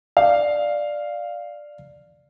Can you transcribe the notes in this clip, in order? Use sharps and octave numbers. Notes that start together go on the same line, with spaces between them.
D5 F5